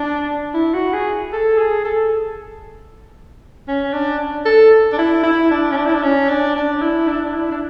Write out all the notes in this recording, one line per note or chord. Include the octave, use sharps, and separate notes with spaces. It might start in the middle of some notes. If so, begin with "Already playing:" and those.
Already playing: D4
E4
F#4
G#4
A4
G#4
A4
C#4
D4
A4
D4
E4
E4
D4
C#4
D4
E4
D4
C#4
D4
D4
E4
D4
D4
E4
D4